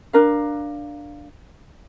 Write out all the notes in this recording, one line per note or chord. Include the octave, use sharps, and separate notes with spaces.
D4 A#4 F5